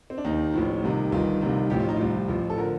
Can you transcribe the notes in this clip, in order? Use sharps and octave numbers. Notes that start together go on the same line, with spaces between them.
C4
D4
D#2 D#3 D#4
A1 A2 F3
C2 C3 D#3
G1 G2 D#3 F4
C2 C3 D#3
A1 A2 F3 G4
F4
D#4
C2 C3 F3 F4
A1 A2 F3
A4
D3 F3 A#4